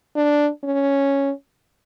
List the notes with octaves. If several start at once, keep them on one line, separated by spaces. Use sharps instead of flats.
D4
C#4